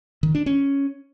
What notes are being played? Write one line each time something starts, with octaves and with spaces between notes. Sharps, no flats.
D#3
D4
C#4